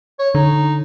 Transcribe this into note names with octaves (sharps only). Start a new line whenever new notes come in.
C#5
D3 D#4